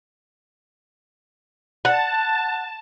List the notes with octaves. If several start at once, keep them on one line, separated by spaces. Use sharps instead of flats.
F#5 A5